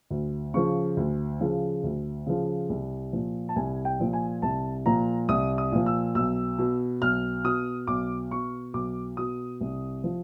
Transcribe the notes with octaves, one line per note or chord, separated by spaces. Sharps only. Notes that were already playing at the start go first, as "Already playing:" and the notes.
D2
C#3 F3 C#6
D2
C#3 F3
D2
C#3 F3
C2
A#2 F3
A5
C2 G#5
G5
A#2 F3
G#5
C2 A5
A#2 F3 A#5
C2 D#6
D#6
A#2 F3
E6
B1 E6
B2
B1 F6
B2 D#6
B1 D6
B2 C#6
B1 D6
B2 D#6
C2
F3